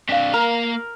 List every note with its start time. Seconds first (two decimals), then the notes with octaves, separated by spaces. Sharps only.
0.09 C4 D4 F5 B6
0.34 A#3 A#4 A#5